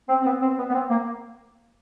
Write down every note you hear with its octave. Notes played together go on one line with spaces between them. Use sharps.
C4
C4
B3
C4
B3
B3
C4
A#3